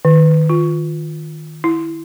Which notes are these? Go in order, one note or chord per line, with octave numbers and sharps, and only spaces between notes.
D#3
F4
E4